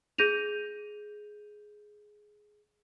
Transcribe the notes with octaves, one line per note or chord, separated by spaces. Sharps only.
G#4 G6 A#6 D#7 F7